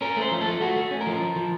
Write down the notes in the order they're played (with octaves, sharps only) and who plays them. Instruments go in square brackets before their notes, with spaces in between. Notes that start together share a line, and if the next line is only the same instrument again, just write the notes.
[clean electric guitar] C#4 A#4
A3 C5
F3
A4
A3
A3 F#4
A3
C#4
A#4
F3
F3
F3